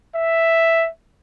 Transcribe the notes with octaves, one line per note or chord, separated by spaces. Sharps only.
E5